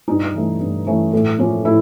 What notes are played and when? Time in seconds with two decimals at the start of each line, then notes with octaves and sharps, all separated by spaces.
0.08 G2 D#4
0.34 E3 A3 C#4
0.60 G2
0.87 E3 A3 C#4
1.13 A2
1.39 F3 A#3 C#4
1.65 A2 E4